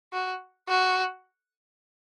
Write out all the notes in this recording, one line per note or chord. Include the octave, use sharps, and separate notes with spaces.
F#4
F#4